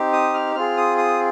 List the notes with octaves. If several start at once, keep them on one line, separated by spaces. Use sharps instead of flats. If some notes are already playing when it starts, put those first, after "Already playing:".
Already playing: C4 D#4 G4
D#6
F6
C4 F4 G#4 F6
D#6
D#6